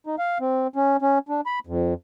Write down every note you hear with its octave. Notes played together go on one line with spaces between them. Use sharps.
D#4
F5
C4
C#4
C#4
D4
B5
F2